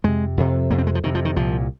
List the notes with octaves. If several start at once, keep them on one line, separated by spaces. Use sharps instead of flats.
F2 C3 G#3
F2 C3
F2 C3 A#3
C4
G#3
F3
F2 C3 D#3
F3
D#3
C2 A#2 F3